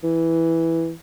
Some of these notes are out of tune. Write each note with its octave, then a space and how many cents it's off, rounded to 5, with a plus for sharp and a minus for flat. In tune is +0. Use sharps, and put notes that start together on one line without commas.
E3 -5